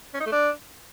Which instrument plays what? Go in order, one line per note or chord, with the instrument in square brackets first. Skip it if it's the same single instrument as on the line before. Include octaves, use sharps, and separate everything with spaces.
[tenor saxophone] C#4
D#4
A3
D4